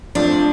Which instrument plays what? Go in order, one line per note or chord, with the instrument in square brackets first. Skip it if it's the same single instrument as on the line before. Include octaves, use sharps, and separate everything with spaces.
[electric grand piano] F2 F3 A3 F4 [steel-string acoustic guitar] D4